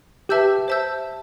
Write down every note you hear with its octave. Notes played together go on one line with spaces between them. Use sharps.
G4 B4 E5 A5 E6 G6
C5 E5 A5 E6 G6